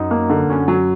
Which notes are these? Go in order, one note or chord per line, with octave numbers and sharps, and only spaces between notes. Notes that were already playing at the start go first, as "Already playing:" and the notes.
Already playing: F#2 D#4
A#3
D3
F#2 C#4
F#3